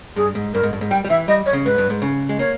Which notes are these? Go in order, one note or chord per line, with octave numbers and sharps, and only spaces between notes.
G2 G#4
G#2
G2 A#4
G#2
G2
G#2
G3 G5
G3
E3 E5
G3 D#5
C#5
C#3
G#2 B4
G2
G#2
C#3
G#3
A#3 C#5